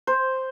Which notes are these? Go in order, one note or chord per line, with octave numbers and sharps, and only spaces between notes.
C5